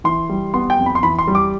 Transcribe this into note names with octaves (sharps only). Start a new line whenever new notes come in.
E3 C6
G3
B3 C6
G5
F2
B5
C6
E3 B5
C6
G3
D6